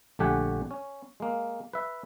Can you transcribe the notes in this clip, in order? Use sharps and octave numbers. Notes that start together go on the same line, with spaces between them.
A#1 D3 A3 G4 F#5 G#5
C#4
G#3 A#3
B4 E5